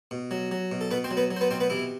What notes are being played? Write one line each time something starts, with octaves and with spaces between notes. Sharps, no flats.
B2
F#3
F#3
B2
A4
B2 B3 B4
C4 C5
F#3
B3 B4
F#3
C5
B3 B4
B2 C4 C5
B3 B4
C3 E3 E4